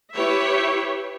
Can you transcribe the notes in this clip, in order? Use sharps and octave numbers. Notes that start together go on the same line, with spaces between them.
E4 G4 B4 C#5 E5